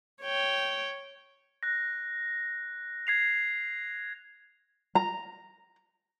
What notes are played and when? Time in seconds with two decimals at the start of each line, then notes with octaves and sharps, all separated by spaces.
0.23 C#5 G5
1.63 F#6 A#6
3.07 G#6 C7 F7
4.95 A#5